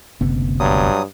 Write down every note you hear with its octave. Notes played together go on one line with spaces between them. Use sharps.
F#1 D2 C3 B3
G2 F#3 D#6